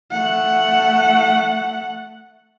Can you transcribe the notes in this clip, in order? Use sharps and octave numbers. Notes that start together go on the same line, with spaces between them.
A3 F#5